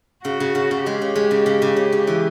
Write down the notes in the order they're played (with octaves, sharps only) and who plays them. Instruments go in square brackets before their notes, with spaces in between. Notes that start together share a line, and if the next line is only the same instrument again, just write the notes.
[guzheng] C#3 [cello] F#4
[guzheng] C#3
C#3
C#3
[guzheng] G#3 [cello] G4
[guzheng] C#3
G#3
C#3
C#3
C#3
C#3
C#3
E3